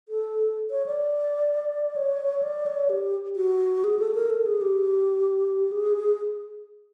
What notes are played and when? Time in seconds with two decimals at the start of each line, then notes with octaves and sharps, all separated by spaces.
0.09 A4
0.70 C#5
0.86 D5
1.96 C#5
2.43 D5
2.66 C#5
2.89 G4
3.36 F#4
3.84 G#4
3.99 A4
4.15 A#4
4.30 A4
4.46 G#4
4.61 G4
5.72 G#4